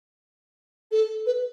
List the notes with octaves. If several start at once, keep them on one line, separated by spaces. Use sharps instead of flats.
A4
B4